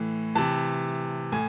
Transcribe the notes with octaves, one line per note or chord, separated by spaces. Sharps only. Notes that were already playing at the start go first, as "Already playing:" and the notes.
Already playing: A2 E3
C3 E3 A5
A2 G#5